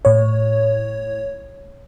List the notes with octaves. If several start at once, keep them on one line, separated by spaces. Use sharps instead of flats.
A2 C#5